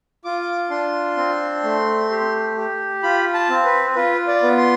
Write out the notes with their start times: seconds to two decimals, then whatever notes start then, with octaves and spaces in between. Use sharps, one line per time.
0.24 F4 D6
0.70 D4 C6
1.17 C4
1.63 A3
2.10 G4
2.57 G4
3.03 F4 B5
3.34 A5
3.50 C4
3.65 B4
3.95 F4 B4
4.27 D5
4.43 B3
4.58 C6